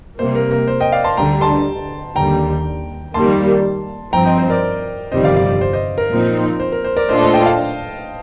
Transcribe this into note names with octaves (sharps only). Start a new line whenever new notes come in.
C3 G3 A#3 C5
A#4
A#4
C5
D#5 G5
D5 F5
A5 C6
D2 D3 G3 G5 A#5
A5 C6
D#2 D3 G3 G5 A#5
F2 D#3 G3 A#3 A5 C6
G2 F3 C4 G5 A#5
D#5 G5
C5 D#5
A#4 D5
G1 F2 C3 D#3 G3 C5 D#5
D5 F5
D5 F5
C5
C5 D#5
A#4
A#2 F3 C4 D#4
C5
A#4
C5
A#4 D5
A#2 A3 D4 F4 A4 C5 D#5
C5 D#5
D#5 G5
F5 A5